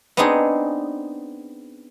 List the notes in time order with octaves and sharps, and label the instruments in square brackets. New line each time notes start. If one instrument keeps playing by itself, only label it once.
[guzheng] B3 C4 D4 D#4 G#4